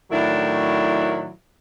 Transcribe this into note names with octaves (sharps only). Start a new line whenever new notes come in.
A2 D#3 F#3 D4 E4